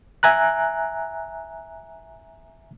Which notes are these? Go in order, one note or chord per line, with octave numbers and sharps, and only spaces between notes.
E5 G#5 A#5 F#6